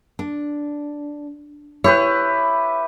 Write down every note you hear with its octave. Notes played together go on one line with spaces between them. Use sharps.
D4
E4 G4 B4 C#5